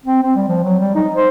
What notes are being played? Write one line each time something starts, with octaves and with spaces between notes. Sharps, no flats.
C4
C4
G3
F3
F#3
G3
D#4
C5